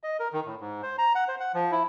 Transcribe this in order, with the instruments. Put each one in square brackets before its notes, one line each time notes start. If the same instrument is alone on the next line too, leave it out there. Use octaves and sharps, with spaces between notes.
[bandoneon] D#5
A#4
D#3
A2
G#2
C5
A#5
F#5
C5
F#5
F3
E4